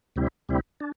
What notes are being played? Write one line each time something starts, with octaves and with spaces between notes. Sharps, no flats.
D2 C3 G3 C4 E4
D2 C3 G3 C4 E4
D4